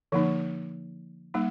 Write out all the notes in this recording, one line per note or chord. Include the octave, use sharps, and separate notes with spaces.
D3 F3 A#3 D#4
G3 A#3 D#4